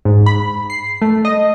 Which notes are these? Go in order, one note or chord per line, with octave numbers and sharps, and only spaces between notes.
G#2
B5
C7
A3
D#5